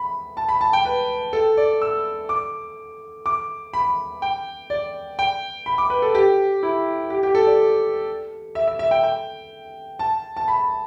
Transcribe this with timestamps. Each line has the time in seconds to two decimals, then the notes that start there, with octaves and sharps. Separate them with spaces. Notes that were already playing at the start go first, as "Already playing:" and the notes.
Already playing: B5
0.37 A5
0.49 B5
0.61 A5
0.73 G5
0.85 B4
1.33 A4
1.57 D5
1.82 E6
2.29 D6
3.26 D6
3.74 B5
4.22 G5
4.70 D5
5.19 G5
5.66 B5
5.78 D6
5.90 B4
6.02 A4
6.15 G4
6.63 E4
7.10 G4
7.23 G4
7.35 A4
7.47 D5
8.55 E5
8.68 E5
8.79 E5
8.91 G5
9.04 G5
9.99 A5
10.37 A5
10.48 B5